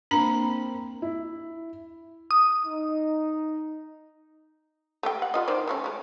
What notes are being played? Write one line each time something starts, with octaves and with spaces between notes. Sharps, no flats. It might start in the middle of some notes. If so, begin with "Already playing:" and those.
A#3 C4 D4 A#5 B5
E4
D#6
D#4
A3 G4 G5
F#5
G3 F4 D#5
D#3 C5 D5
F#3 A3 C#4
G#3 A3